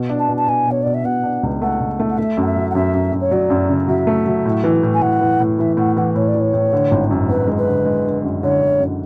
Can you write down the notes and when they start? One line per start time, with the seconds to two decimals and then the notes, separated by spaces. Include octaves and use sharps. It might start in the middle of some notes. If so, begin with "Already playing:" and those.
Already playing: B2
0.10 D4
0.19 A5
0.29 B2
0.36 A5
0.48 B2 G#5
0.67 B2 C#5
0.82 B2 D5
0.94 E5
1.04 B2 F#5
1.23 D4
1.43 C#2
1.62 A3 F#5
1.80 C#2
2.00 A3
2.09 F#5
2.17 A3 E5
2.37 F#2 F#5
2.46 E5
2.56 F#3
2.70 F#5
2.75 F#2 E5
2.94 F#2
3.12 F#2
3.20 C#5
3.31 F#3 D5
3.50 F#2
3.69 C#3
3.88 F#3 E5
4.07 A3
4.26 F#3
4.45 A2
4.64 E3
4.83 A2
4.94 G#5
5.01 A2 F#5
5.21 E3
5.40 A2
5.59 E3 E5
5.77 A2 F#5
5.97 E3 F#5
6.15 A2 C#5
6.28 D5
6.34 E3
6.40 C#5
6.54 A2
6.73 D3
6.91 G#1
7.11 F#2
7.29 G#1 B4
7.48 G#3
7.57 B4
7.68 D3
7.85 G#3
8.05 D3
8.24 F#2
8.43 D3 C#5
8.62 D3
8.80 F#2